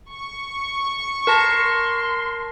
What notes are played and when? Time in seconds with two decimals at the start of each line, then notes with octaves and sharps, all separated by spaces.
0.12 C#6
1.27 A#4 A5 C6 A#6